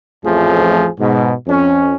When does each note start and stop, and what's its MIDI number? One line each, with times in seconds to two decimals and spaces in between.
0.24 0.86 33
0.24 0.86 41
0.24 0.86 53
0.24 0.86 57
0.24 0.86 68
0.98 1.32 44
0.98 1.32 47
1.47 1.94 41
1.47 1.94 61